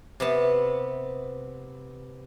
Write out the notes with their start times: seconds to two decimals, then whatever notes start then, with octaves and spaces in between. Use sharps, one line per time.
0.20 C3 B3 A5